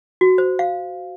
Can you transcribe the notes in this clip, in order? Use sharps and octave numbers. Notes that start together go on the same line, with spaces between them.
F#4
C5
F5